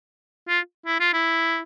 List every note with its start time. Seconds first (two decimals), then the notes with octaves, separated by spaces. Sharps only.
0.48 F4
0.86 E4
1.00 F4
1.13 E4